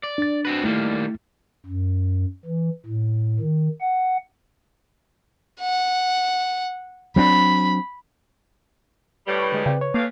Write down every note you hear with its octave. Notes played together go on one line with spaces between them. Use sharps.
D5
D4 A6
C4 F#4 B4
D#3 G3 A3 A#3 E4
F#2
E3
A2
D#3
F#5
F#5
F#3 C4 D4 B5
A2 G3 B4
B5 C#6
D3 G#3 D#5
C#3 C4 D5 G5
C#5
A2 E3 A#3 F5